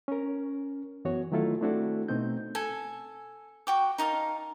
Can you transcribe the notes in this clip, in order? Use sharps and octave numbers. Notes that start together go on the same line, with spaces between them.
C#4 A#4
F#2 E3 B3 F#4 C#5
D#3 F#3 A3 E4 F4 A4
A3 C4 D4 E4 F#4 A4
B2 A3 C4 D#4 G6
A4 G#5
F#4 G5 D6
D#4 A#4 F5 A5